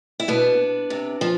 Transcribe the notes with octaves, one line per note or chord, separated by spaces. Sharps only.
E4
B2 B3 D4
C3
F3